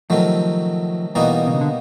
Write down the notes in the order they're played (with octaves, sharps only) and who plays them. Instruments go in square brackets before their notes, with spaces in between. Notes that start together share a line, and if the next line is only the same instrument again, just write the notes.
[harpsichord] C3 D#3 F#3 A3 [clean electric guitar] F3
[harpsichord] B2 G3 A#3 D#4 F#4 [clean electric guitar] E3
[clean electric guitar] C3
C#3
D3